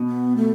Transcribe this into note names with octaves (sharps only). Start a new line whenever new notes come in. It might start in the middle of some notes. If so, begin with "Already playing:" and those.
Already playing: B2
B3
A3